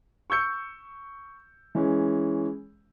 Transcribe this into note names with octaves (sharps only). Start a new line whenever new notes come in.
C#6 E6 G6 C#7
E3 G#3 C#4